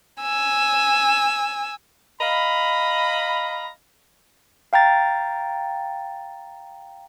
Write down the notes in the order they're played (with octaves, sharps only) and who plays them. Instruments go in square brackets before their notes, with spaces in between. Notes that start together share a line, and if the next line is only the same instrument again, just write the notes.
[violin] G#5 E6
[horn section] D#5 F5 A#5 B5
[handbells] F5 G5 A#5 A6